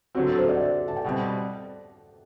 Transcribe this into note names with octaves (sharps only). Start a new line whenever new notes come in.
D3 F#3 C4 F#4
A4
C5
D5
F#5
E5
A5
G5
B2 G3 C4 F#5